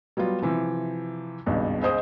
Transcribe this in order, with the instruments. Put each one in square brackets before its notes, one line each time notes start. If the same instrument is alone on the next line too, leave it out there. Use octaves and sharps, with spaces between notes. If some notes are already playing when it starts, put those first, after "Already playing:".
[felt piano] F#3 G3 B3 F4
C3 E3 F3
G#1 C#2 G2 B2
C#2 G#4 C5 D#5 D#6